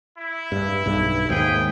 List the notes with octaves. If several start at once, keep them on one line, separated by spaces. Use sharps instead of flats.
E4
G2
B1 G2
D#2 G#2 G#4 G5